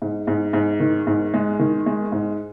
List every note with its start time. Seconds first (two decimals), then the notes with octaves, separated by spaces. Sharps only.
0.02 G#2
0.27 G#2
0.53 G#2
0.80 D#3
1.07 G#2
1.34 G#3
1.59 D#3
1.86 G#3
2.12 G#2